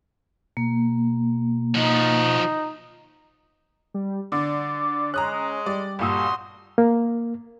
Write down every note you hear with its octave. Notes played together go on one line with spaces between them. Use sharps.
B2 A#3
F3 D#4 F#4
G3
D3 D5
G#3 C#4 A#5 D#6 F#6
G3 D5
G1 A#2 F#4 C6 D#6 E6
A#3